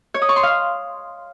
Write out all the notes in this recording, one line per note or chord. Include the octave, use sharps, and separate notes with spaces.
C#5
D#6
C#6
C6
F5